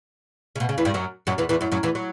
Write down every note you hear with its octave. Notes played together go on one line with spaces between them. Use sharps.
C#3
B2
C#3
E2 E3
G2 G3
F#2 F#3
F#2 F#3
E2 E3
E2 E3
F#2 F#3
F#2 F#3
E2 E3
F#3